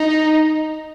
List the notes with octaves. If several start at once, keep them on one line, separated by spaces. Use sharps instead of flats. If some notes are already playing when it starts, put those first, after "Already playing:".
Already playing: D#4